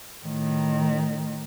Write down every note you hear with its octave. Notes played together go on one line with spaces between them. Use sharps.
A2 D#3